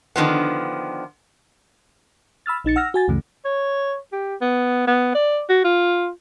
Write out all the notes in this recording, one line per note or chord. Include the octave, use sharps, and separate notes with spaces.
D3 D#3 F3 B3
B5 E6 F6 A6
A#1 D#4 A6 C#7
F#5 E6 F6 A#6
F#4 G#5 A6
C#2 F#2 C#3 E3 A3
C#5
G4
B3
B3
D5
F#4
F4